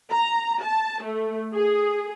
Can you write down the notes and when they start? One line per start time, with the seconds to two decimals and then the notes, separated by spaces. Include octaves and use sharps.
0.11 A#5
0.62 A5
1.04 A3
1.54 G#4